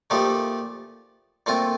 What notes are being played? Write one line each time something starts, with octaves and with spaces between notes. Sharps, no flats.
A#2 F3 A3 D#4 G4
A#2 A3 C4 F4